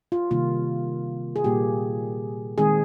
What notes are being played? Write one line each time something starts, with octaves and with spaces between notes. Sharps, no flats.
F4
C3 D#3 G3 A#3 F4
G#4
A#2 G3 A#3 G4
D#3 G#3 C4 G#4